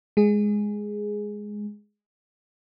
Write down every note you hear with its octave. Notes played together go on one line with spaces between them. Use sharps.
G#3 G#4